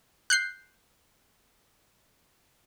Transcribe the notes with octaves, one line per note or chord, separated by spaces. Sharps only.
F#6 G6 C7